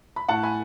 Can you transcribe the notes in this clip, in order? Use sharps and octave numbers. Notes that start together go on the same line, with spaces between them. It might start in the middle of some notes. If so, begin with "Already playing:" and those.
B5
A2 F#5 A5
G#5 B5